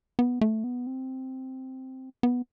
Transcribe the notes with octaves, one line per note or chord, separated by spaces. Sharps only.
B3
A3
B3
C4
B3